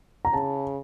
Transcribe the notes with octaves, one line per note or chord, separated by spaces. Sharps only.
A#5
C#3 A5